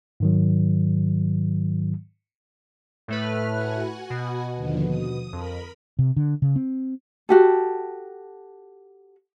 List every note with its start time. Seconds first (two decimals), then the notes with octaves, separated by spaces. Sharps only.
0.20 G#2 D#3 F#3
3.08 A2 A3 B4 F6
3.53 F#4 F#5 G#5
4.10 B2
4.56 D#2 D3 F3
4.88 D#6
5.33 F2 A#4 B5
5.99 C3
6.17 D3
6.42 C#3
6.56 C4
7.29 F#4 G4 A4